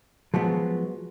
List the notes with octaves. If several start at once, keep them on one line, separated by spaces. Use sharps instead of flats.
F3 F#3 G#3 B3